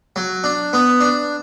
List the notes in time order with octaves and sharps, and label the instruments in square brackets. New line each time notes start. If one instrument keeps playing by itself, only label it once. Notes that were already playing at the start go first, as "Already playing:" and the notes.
[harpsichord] F#3
D4
B3
D4